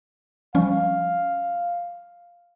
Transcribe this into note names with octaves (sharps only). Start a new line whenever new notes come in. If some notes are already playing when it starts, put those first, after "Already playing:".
F3 G3 C#4 F5